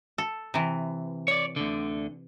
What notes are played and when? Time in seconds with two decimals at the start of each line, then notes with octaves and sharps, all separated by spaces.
0.18 A4
0.54 C3 E3
1.28 C#5 D5
1.56 D2 D3